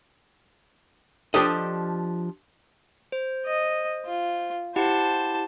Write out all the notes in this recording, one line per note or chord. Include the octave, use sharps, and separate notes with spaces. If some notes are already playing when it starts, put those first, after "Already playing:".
F3 D4 G4 A4 D#5
C5
D#5
F4
E4 G4 C5 F#5 A5